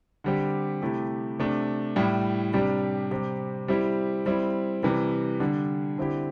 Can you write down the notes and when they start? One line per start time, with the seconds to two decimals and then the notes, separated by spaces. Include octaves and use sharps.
0.24 D3 G3 C4 G4
0.82 C3 A3 E4 G4
1.39 C3 A3 D4
1.96 A2 G3 E4
2.54 C3 G3 D4 G4
3.11 C3 G3 C4 G4
3.68 G3 C4 E4 G4
4.26 G3 C4 E4
4.83 C3 E3 G3
5.40 D3 G3 D4
5.98 D3 C4 E4 G4